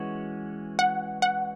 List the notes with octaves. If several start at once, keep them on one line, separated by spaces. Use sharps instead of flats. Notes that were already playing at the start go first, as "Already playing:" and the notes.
Already playing: E3 G#3 C#4 F#4
F#5
F#5